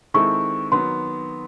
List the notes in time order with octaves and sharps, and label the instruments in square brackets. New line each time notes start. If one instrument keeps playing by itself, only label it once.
[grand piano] D#3 G#3 C4 E4 A4 [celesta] C#6
[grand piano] D#3 F#3 B3 [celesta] C6